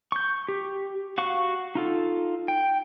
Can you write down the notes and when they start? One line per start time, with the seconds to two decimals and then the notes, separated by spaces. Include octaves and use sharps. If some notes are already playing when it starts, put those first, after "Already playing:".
0.12 C#6 G6
0.48 G4
1.18 F#4 F5 C#6
1.75 D#4 F4 A4
2.48 G5